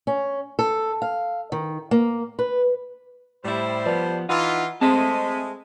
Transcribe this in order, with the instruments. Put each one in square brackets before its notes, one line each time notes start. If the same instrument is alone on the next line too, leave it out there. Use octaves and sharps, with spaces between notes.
[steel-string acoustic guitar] C#4
A4
F5
D#3
A#3
B4
[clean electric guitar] A2 E4 [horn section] G3 C5
[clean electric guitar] F3 B3 [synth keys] B4 D5 A5
[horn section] E3 F4 [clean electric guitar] D#4 [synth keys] F#5
[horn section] G#3 A3 [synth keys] C4 B6 D#7 [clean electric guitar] C5 D#5 A5